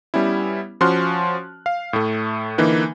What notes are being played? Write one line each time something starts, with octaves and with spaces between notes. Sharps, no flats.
G3 B3 C#4 E4
F3 C#4 F#4 C6 F6 F#6
F5
A2 A3
D3 E3 A#3 D#4 B4